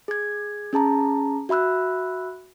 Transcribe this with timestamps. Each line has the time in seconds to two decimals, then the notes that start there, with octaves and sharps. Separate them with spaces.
0.08 G#4 G#6
0.73 C#4 G#4 A5 A#5
1.49 F#4 E5 B5 E6 F#6